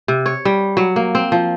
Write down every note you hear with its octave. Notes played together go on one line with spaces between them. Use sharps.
C3
C#5
G3
F#3
A#3
C4
F3